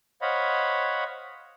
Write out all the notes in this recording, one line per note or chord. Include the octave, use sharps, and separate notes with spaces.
C5 C#5 D#5 F5 F#5 B5